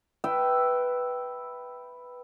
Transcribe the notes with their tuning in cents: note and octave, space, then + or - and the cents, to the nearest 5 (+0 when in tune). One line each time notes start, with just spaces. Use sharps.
B4 +0 E5 +0 G5 -15